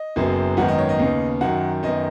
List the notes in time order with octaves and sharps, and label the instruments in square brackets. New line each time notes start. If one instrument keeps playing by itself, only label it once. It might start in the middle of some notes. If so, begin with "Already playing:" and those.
Already playing: [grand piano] D#5
F#1 F#2 F#3 B3
G#1 F#2 D#3 B3 F#5
D#5
C#5
D#5
D#2 C#3 B3
F#2 D#3 F#3 F#5
F#2 D#3 B3 D#5